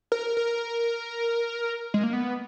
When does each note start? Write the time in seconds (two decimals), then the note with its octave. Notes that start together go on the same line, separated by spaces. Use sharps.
0.12 A#4
0.37 A#4
1.94 G#3
2.03 A#3
2.13 B3